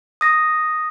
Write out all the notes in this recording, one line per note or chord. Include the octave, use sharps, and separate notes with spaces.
D#6 A#6